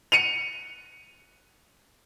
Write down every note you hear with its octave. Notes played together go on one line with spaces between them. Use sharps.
C#7 D#7 F7